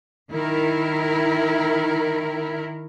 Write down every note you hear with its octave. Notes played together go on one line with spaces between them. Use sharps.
D#3 E4 A#4